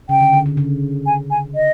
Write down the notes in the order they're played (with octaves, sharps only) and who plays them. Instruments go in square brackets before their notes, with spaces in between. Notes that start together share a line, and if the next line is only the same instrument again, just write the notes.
[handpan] C#3 [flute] G5
[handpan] D3
D3
D3
C#3
[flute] G#5
G#5
D#5